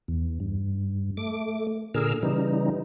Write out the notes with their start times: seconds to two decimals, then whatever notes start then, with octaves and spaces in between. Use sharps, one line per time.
0.08 E2
0.40 G2
1.17 A3 D6
1.94 A#2 D3 G#4 A#4 E6 F6
2.23 C#3 E3 G3 D#4